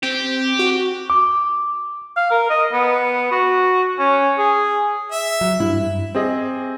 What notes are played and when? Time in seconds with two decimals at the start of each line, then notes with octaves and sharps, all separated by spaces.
0.03 C4 G4
0.59 F#4
1.10 D6
2.17 F5
2.31 A#4
2.50 D#5
2.72 B3
3.32 F#4
3.99 C#4
4.38 G#4
5.12 E5
5.41 F#3
5.60 G2 E4
6.15 C4 G4 G#4 D#5